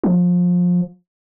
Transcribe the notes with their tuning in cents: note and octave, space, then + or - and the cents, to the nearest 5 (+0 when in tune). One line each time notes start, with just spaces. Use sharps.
F3 +25